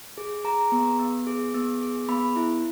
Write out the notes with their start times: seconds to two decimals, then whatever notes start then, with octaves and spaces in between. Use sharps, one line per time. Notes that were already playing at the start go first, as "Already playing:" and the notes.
0.18 G#4
0.44 G#4 A#5
0.72 B3
0.99 B3
1.27 G#4
1.54 B3
1.81 G#4
2.09 B3 B5
2.36 E4